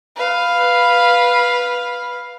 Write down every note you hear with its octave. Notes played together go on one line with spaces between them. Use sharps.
B4 F5